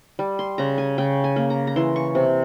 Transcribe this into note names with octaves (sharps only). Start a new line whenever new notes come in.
G3
C6
C#3 A#5
G#5
C#3 G5
G#5
A#3
A#5
A#5
E3 C6
C#6
C3